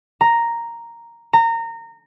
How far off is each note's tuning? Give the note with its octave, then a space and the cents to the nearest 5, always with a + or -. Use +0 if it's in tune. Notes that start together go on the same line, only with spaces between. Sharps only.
A#5 +0
A#5 -25